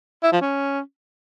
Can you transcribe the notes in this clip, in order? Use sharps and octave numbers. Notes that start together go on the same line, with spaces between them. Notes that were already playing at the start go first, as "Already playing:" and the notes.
E4
F3
C#4